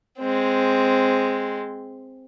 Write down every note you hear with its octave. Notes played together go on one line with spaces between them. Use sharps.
G#3 C4